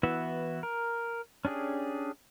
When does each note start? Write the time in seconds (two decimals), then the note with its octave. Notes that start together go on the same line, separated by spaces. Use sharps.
0.03 E3 B3 E4 F#4 E5
0.63 A#4
1.45 C#4 D4 G4 G#4